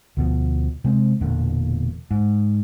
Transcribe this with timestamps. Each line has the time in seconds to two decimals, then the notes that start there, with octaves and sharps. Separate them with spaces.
0.17 D2 B2 F3
0.84 C3 G#3 C4
1.21 E1 E2 A#2 D3
2.11 G#2